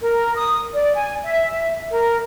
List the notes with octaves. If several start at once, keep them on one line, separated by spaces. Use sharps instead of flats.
A#4
D#6
D5
G#5
E5
A#4